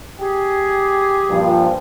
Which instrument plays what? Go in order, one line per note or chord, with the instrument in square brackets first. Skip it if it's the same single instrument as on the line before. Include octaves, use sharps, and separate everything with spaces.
[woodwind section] G4 G#4
[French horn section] G2 A#2 F3